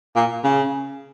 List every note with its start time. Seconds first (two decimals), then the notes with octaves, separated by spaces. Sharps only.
0.16 A#2
0.44 C#3